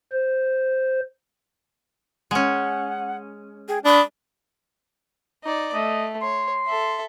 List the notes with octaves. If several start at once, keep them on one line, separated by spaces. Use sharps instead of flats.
C5
G#3 C#4 F#5
G#4 G5
D4 B5 D#6
D#4 D5
A3 D#5
C#5 C6
A4 E5